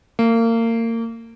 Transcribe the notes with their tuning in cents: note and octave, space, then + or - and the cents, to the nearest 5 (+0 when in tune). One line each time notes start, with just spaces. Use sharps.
A#3 -30